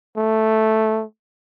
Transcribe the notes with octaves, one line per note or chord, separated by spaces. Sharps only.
A3